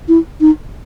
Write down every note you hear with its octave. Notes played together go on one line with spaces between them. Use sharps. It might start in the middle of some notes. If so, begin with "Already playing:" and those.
E4
D#4